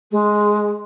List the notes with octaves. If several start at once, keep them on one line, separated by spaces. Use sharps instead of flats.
G#3